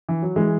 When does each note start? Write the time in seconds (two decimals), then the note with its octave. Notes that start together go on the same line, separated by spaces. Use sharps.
0.09 E3
0.22 F#3
0.36 E3 G#3